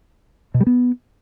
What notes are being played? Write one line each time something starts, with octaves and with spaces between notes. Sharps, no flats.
B2
G3
B3